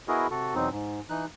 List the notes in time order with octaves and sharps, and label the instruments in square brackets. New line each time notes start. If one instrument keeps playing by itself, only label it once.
[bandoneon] B3 E4 F#4 G#4 A#4 D#5
C3 F#4 A4
E2 B2 F#3 C4 D#4
G#2
E3 D#4 F#6